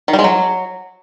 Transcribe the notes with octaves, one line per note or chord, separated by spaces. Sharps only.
D#3
G3
G#3
F#3